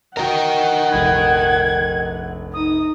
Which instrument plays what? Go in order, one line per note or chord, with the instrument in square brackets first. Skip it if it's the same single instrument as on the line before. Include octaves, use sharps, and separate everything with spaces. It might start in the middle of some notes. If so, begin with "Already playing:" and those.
[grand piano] F#4 A#5 [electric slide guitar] A#4 D#5 G5 [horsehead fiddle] F#5
[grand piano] F1 A#1 B5 [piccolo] G#6
[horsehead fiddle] D#4 [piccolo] D#6